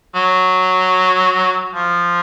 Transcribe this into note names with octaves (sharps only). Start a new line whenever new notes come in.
F#3
F3